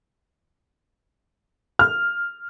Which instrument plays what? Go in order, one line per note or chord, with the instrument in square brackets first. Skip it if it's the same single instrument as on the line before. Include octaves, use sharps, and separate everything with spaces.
[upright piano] F6